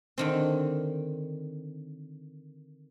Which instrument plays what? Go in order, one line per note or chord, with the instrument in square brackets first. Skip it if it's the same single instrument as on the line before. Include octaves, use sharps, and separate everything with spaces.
[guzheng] D3 D#3 C4